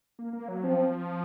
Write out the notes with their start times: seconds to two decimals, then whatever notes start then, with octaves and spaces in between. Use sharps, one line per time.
0.19 A#3
0.33 A#3
0.48 F#3
0.64 F3 C4